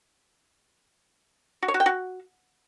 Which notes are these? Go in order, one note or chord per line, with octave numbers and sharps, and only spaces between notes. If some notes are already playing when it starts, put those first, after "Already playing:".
F#4
C#5
F#4
G5
F#4